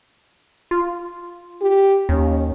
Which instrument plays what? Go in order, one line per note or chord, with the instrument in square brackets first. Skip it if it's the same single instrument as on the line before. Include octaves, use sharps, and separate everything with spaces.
[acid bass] F4
[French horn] G4
[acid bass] D#2 [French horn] C#4